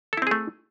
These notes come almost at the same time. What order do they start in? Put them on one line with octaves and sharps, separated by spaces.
A4 E4 C4 G#4 A3